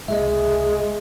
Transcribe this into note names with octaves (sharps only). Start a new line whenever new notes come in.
F1 C#2 G#3 D#5 E5